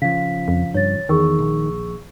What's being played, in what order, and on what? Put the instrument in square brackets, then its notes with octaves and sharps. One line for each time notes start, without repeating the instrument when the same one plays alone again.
[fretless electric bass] C#3 F3 [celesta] F5 B6
[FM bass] F2
[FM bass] G2 [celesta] C#5 A6
[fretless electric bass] E2 [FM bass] D#3 [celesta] G#4 C#6 E6
[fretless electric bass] A#1